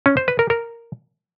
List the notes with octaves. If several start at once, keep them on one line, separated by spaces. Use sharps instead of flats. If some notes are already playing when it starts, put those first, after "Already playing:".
C#4
C5
B4
A#4
A#4